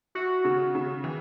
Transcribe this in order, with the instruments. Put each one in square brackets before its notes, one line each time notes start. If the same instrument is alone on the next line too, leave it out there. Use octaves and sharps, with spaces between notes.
[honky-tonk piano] E4 [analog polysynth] F#4
[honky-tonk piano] C#3
C#3
E3